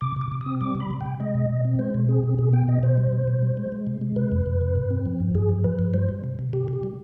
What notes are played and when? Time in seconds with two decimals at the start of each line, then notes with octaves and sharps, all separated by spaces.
0.01 C3 D6
0.16 C3 D6
0.32 C3
0.41 D#6
0.46 C4
0.61 G3 D6
0.75 C3
0.80 B5
0.90 C3
1.01 C3 G5
1.20 G#3 D#5
1.35 B2
1.50 B2
1.65 C4
1.79 G#3 C5
1.94 B2
2.09 C4 G#4
2.23 B2
2.38 B2 G#4
2.53 B3 G5
2.68 B2 D#5
2.83 B2 C5
2.97 G3
3.12 B2
3.27 B2
3.42 G3
3.57 G#3
3.72 G#3
3.87 C3
4.01 G#3
4.16 C3 B4
4.32 F2
4.46 F2
4.61 C3
4.76 G2
4.90 C4
5.06 F3
5.20 G2
5.35 G2 G#4
5.49 F3
5.64 F3 B4
5.79 G2
5.94 G3 C5
6.09 G3
6.24 C3
6.39 C3
6.53 C3 G4
6.68 C3
6.73 G4
6.83 G3